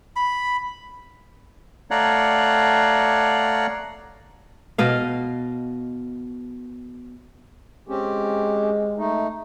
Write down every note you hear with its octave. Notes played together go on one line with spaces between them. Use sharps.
B5
A3 C#5 D5 F5 F#5 A#5
B2 D#5 F5
G#3 C4 C#4 G4
A3 D#4